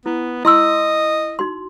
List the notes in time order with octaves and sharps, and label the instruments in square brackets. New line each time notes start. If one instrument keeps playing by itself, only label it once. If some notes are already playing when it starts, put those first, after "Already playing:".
[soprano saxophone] B3 [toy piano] E4
[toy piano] E4 C6 E6 [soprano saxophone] D#5
[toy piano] D#4 F#4 C6